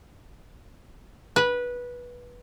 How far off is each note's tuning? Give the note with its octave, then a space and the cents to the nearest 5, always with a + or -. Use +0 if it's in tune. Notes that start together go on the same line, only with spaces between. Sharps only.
B4 -15